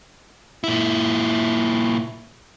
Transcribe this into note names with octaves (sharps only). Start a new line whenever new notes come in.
A#2 E4